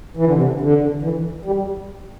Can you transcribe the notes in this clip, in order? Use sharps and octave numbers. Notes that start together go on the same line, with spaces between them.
E3
D3
C3
D3
D3
E3
G3